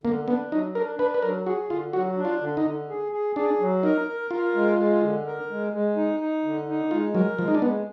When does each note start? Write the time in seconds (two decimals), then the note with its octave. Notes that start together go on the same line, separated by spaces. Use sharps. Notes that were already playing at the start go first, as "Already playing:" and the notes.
0.04 D3 A#3
0.28 B3 D4
0.51 F#3 D#4
0.75 D4 A#4
0.99 D4 B4
1.14 B4
1.22 F#3 A#4
1.46 F#4 G#4
1.70 D3 F4
1.93 F#3 F#4
2.17 D4
2.25 F4
2.41 D3
2.57 D#4
2.65 D3
2.89 G#4
3.12 G#4
3.36 D4 G#4
3.60 F#3
3.83 D#4 A#4
4.08 A#4
4.31 F4 A#4
4.55 G#3
4.78 G#3
5.02 D3
5.26 A#4
5.50 G#3
5.73 G#3
5.96 D#4
6.20 D#4
6.44 D3
6.68 D#4
6.91 G#3 F4
7.14 F#3 A#4
7.39 F3 G#3
7.48 D#4
7.55 D4
7.62 G#3 B3